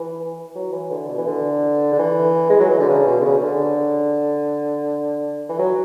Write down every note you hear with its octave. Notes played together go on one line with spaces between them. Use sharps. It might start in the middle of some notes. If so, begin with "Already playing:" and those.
Already playing: E3
F#3
E3
D3
B2
E3
D3
D3
E3
G#3
F#3
E3
D3
C#3
B2
D3
C#3
C#3
D3
E3
F#3